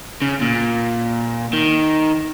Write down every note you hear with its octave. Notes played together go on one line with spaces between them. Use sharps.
C#3
A#2
D#3